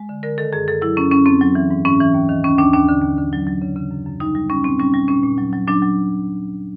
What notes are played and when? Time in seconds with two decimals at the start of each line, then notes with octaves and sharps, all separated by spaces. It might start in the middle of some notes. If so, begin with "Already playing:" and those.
Already playing: G#3
0.09 D3
0.23 D3 A#4
0.38 D#3 A4
0.53 F#2 G#4
0.68 F#2 A4
0.82 F#3 E4
0.97 F#2 C#4
1.11 F#2 C#4
1.26 F#2 C4
1.41 F#3
1.55 E3
1.70 G#2
1.85 G#2 C#4
2.00 E3
2.14 D#2
2.29 D#3
2.44 D#2 C#4
2.58 D#2 D4
2.73 D#2 D4
2.88 D3
3.02 D#2
3.18 D3
3.33 F#3
3.47 F#3
3.62 C#3
3.76 C#3
3.91 F#2
4.06 F#2
4.20 G3 D#4
4.35 G3
4.50 G3 C#4
4.64 A#2 C4
4.79 G3 C#4
4.94 G3
5.08 A#2 C#4
5.23 A#2
5.38 F#3
5.53 F#3
5.67 F#3 D4
5.82 F#3